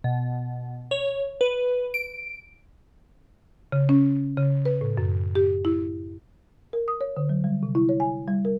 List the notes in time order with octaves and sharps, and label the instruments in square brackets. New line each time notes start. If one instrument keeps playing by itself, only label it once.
[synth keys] B2
C#5
B4
D7
[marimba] C#3
C#4
C#3
B4
A2
F#2
G4
E4
A#4
D#6
C#5
D3
F#3
G3
C3
E4
C#5
G#5
G3
A#4